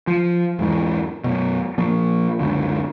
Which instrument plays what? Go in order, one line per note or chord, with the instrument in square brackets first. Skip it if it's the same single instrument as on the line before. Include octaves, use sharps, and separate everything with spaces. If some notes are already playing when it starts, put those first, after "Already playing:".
[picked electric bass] F3
E2 G#2 E3
F#2 B2
A#2 F3 A#3
F#1 C#2 D3